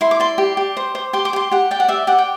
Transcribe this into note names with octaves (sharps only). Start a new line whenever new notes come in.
E4 C6
D6
D5 C6
G4
G4
C5
C5
G4 C6
D6
G4 C6
G4 F#5
D5 G5
F#5
G4 E5
G4 F#5
G5